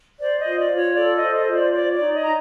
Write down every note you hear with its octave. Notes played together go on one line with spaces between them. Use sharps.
C5 D5
D#5
F4
D5
F4
C#5
A4 D5
D#5
C5
D#5
F4
D5
C#5 D5
D5
D#4
D#5
D#4 A#5